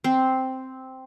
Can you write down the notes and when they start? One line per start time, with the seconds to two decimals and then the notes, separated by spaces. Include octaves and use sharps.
0.04 C4